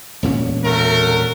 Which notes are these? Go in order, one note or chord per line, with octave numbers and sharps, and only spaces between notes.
E1 A#2 C#4
A3 F#4 A#4